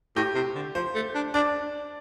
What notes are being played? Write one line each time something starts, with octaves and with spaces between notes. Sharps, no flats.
A2 G4
C3
D3
F3 C5
A3
D4
D4 D5